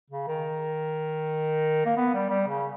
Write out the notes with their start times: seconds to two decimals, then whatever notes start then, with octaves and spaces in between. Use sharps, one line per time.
0.10 C#3
0.27 D#3
1.85 A#3
1.97 B3
2.14 G3
2.30 G3
2.47 C#3